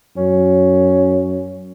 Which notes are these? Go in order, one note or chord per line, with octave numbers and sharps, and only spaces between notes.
F#2 C#4